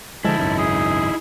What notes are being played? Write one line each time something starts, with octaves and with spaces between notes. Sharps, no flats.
D3 F3 G#3 D#4 E4 A5
G#1 C#2 F#2
G#4